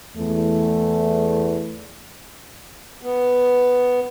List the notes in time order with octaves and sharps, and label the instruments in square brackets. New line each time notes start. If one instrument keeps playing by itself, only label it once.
[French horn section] E2 A3
[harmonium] B3